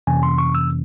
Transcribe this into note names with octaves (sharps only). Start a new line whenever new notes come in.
F2 C3 E3 A#3 C#4 G#5
C6
C#6
E6